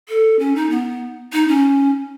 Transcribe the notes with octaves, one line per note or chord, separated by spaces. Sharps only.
A4
C#4
D#4
B3
D#4
C#4